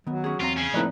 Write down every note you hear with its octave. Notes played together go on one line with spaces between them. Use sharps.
D#3 F#3 B3
C#4 G#4
E2 C4 F4 C#5 A#5
C#3 C#4
A2 F3 A#3 C4 D#4 B4 D5